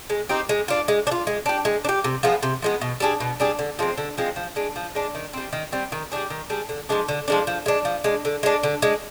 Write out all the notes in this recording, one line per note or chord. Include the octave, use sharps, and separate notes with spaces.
G#3
C4 D#4 G4
G#3
D4 F4
G#3
D4
F4
G#3
D4 G4
G#3
D4
G4
C3
F3 G#3 B3
C3
F3 G#3 B3
B2
G3 D4 G#4
B2
G3 D4 G#4
D3
F3 G#3 C4
D3
F3 G#3 C4
F3
G#3 D4
F3
G#3 D4
D#3
G3 C4
D#3
G3 C4
D#3
G3 D4 G#4
D#3
G3 D4 G#4
D3
F3 G#3 D4
D3
F3 G#3 D4
F3
G#3 D4
F3
G#3 D4
D3
G#3 D4
D3
G#3 D4